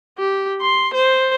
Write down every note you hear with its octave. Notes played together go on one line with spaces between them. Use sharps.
G4
C6
C5